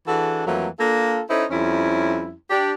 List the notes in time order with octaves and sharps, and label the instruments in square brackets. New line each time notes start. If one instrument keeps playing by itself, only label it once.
[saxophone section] E3 D4 F#4 G#4 A4
F2 E3 F#3 A3 A#3
A#3 D4 F4 A4
C#4 D#4 E4 A4 C5
F2 G3 C#4 E4
D4 G4